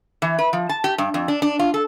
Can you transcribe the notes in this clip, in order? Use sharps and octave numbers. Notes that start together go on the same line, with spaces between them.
E3
B4
F3
A5
G4
G2
F2
D4
D4
F4
A4